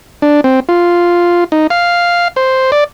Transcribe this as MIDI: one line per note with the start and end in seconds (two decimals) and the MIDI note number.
0.22 0.41 62
0.44 0.60 60
0.69 1.44 65
1.52 1.67 63
1.70 2.28 77
2.36 2.71 72
2.72 2.84 74